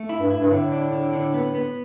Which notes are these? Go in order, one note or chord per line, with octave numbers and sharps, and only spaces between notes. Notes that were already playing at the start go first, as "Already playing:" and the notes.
Already playing: A3
E4
G2
E4
G2
A2 D3
D4
D3
D3
B3
B3